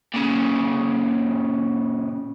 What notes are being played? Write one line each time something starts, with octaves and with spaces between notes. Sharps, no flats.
A#2 C#3